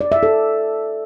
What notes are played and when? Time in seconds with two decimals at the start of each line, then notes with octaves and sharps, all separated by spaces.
0.01 D5
0.12 E5
0.23 A4